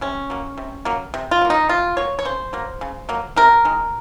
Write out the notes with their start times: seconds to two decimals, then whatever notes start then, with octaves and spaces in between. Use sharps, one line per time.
0.01 C3 C#4
0.30 F#3 A#3
0.58 C3
0.85 F#3 A#3
1.14 C3
1.31 F4
1.41 F#3 A#3
1.50 D#4
1.69 C3 F4
1.97 F#3 A#3 C#5
2.19 C#5
2.25 C#3 C5
2.53 F#3 A#3
2.81 C#3
3.09 F#3 A#3
3.36 C3 A#4
3.65 D#3 G#3